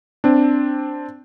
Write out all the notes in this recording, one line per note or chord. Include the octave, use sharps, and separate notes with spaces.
C4 D4